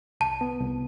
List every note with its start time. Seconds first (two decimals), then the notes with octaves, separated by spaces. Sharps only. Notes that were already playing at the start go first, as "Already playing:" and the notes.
0.21 C2 A5
0.41 B3
0.61 C2